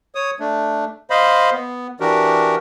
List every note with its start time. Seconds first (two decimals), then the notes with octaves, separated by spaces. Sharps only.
0.15 C#5 D#6
0.40 A3 D4
1.10 C5 D#5 F5 B5
1.53 B3
2.00 E3 D4 F#4 G4 A#4